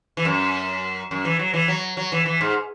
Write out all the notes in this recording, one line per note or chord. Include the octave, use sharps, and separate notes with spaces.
E3
F#2
F#2
E3
F#3
E3
F#3
F#3
E3
E3
G#2